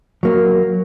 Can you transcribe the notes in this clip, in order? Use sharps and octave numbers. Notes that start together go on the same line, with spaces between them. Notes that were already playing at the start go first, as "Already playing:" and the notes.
F#3 A#3